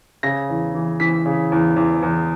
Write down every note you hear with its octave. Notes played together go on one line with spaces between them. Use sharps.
C#3 A#6
E2
E3
E3 B6
C#3
E2
E2
E2